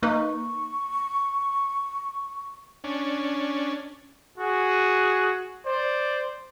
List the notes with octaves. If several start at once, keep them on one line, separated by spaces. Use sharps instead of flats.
A#3 D#4 B4 C#6
C#4 D4
F#4 G#4
C5 D5